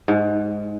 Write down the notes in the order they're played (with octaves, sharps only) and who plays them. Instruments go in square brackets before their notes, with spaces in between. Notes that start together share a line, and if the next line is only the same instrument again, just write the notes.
[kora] G#2